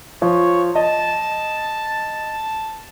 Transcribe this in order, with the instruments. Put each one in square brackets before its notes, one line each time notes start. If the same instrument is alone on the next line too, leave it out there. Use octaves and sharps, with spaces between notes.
[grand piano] F3 [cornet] C#5
[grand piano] D#5 [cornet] A5